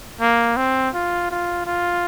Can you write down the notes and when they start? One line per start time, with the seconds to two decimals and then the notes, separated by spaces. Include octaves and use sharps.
0.21 A#3
0.57 C4
0.94 F4
1.31 F4
1.66 F4